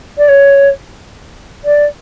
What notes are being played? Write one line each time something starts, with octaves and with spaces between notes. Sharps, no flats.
D5
C#5
D5